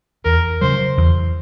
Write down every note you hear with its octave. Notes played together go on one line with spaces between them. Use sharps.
E2 A#4
C#3 F#3 C5
E2